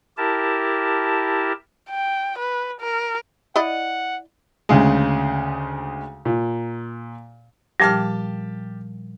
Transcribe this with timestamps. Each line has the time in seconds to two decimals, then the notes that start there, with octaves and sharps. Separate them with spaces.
0.17 E4 G4 A#4 A5
1.90 G5
2.39 B4
2.81 A#4
3.56 E4 D5 D#5 F#5
4.69 D2 C#3 G#3
6.25 A#2
7.80 A#2 F3 G3 G4 A5 F6